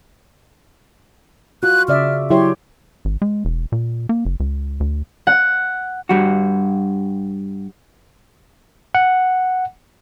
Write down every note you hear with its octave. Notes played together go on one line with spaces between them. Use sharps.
F4 F#4 F#6
C#3 D5 E5 F6
F#3 E4 G4 C#5 C6
G#1
G#3
E1
A#2
A#3
F#1
C#2
D2
F#5
G2 G3 F#4
F#5